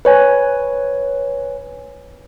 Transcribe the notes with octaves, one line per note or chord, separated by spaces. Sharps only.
B4 C#5 G#5